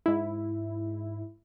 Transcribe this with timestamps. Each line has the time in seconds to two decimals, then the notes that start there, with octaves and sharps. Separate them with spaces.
0.06 G#2 E4